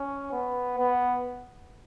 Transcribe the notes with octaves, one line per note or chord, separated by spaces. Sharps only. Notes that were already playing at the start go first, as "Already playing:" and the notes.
Already playing: C#4
B3
B3